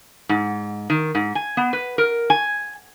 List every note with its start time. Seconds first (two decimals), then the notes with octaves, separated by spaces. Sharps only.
0.29 G#2
0.90 D#3
1.15 G#2
1.35 G#5
1.57 B3
1.73 B4
1.98 A#4
2.30 G#5